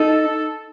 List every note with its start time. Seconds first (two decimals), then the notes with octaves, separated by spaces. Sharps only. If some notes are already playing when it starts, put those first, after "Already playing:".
Already playing: D#4 A4